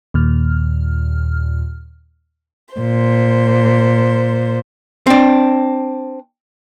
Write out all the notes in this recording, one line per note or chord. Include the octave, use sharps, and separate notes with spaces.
D#2 A#2 F6
A#2 C5
C4 D4